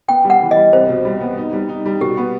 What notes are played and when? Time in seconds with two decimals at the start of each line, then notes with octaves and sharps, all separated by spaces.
0.08 B3 G5
0.25 G3
0.30 F#5
0.41 E3
0.51 D#5
0.56 G3
0.73 C2 C5
0.89 B2
1.05 G3
1.21 B3
1.37 D#4
1.53 G3
1.69 D#4
1.86 G3
2.00 B2 G4
2.17 B3